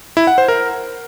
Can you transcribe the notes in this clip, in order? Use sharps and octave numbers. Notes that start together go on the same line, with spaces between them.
E4
F#5
C5
A#4